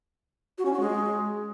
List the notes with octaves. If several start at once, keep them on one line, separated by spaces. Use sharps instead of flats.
F#4
C#4
F#4
G#3